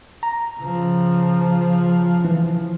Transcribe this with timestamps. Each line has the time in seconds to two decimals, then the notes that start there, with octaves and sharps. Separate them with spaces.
0.23 A#5
0.61 C#3 F3
2.25 E3